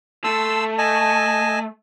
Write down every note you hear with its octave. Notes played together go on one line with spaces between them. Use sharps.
A3 A5 C6 E6
D#5 G#5 A5